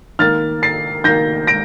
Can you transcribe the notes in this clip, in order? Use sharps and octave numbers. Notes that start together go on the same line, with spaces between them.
D#3 A#3 F6 A6
A6 C7
D#3 A#3 G6 A#6
A#6 D7